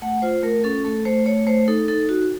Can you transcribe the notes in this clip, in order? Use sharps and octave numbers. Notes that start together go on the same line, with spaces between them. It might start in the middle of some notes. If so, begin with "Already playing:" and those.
A3 F#5
F4 C5
A3 A#4
C#4 A4
A3 A4
A3 C5
A3 C#5
A3 C5
D#4 A4
D#4 A4
F#4